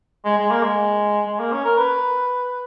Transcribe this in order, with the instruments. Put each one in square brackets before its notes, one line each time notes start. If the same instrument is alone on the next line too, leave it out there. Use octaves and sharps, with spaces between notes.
[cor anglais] G#3
G#3
A#3
G#3
G#3
A#3
C#4
A#4
B4